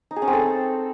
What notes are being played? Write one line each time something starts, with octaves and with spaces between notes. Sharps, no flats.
D#4
G#4
C#4
C4
A4